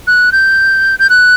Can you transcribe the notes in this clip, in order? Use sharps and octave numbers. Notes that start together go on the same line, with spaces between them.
F#6
G6
G6
F#6